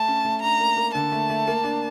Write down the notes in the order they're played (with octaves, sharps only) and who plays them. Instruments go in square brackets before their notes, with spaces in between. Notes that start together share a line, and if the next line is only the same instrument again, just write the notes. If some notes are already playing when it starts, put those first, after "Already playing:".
Already playing: [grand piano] A3 [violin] A5
[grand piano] C#4
A3
[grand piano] D4 [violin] A#5
[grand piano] A#3
A#3
[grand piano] D3 [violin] A5
[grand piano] A3
A3
A#3
D4